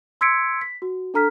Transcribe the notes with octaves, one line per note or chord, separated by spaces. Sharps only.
C6 E6 G#6 B6 C#7 D7
B6
F#4
D4 A4 A#5 F6 B6